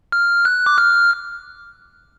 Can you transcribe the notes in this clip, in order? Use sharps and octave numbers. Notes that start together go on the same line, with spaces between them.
F6
F#6
D6
F6